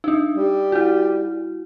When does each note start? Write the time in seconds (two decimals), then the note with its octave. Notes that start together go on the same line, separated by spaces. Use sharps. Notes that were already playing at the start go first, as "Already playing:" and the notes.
0.04 D4 D#4
0.35 G3
0.72 E4 F#4